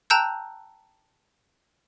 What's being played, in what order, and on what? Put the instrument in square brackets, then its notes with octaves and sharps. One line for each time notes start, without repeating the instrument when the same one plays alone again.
[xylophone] G5 A5 A#5 E6 F#6 G6